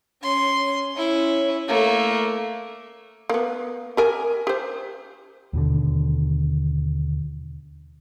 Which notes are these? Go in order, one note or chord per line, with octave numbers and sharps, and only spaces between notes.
C#4 C6
C#4 E4
A3 A#3
A#3 B3
G4 A#4 G#5
G4 C5
D#2 B2 D3